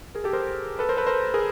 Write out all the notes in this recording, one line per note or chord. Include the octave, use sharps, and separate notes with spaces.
G#4 A#4
G4 A4
A#4 C5
A4 B4
A#4 C5
A4 B4
A#4 C5
G#4 A#4